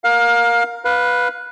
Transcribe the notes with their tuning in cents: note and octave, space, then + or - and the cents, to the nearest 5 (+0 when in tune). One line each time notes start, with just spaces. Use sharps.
A#4 +10 F5 +25
B4 +0 F5 +20